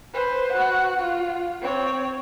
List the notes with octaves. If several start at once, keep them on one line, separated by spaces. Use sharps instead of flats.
B4 C5
F#4 F#5
F4
C4 C#5